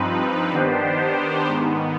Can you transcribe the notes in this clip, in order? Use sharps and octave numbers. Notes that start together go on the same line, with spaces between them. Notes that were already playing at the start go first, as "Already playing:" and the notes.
Already playing: G2 F3 C4 D#4 B4
D#3 B3 D4 G4 C5
G#2 D#3 B3